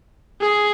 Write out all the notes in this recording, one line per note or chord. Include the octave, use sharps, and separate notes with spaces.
G#4